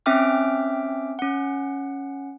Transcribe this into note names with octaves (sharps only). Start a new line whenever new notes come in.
C4 C#4 E5 G5 D6 F6
C#4 F#5